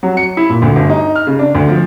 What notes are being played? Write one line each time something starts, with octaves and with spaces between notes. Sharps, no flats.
F#3
C#7
E4
A#2
D2
G1
D#4
F6
C#3
D4
D2
F3